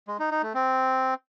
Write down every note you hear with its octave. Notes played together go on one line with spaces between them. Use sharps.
G#3
D#4
D#4
A3
C4